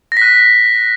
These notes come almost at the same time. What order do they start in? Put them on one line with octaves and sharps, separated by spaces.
A#6 B6 F#6